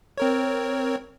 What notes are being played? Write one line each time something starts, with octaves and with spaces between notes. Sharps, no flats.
C4 A#4 C#5